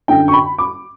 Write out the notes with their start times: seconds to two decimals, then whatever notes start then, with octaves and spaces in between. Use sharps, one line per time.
0.08 F#2 D3 G5
0.28 C#6
0.33 B5
0.58 D6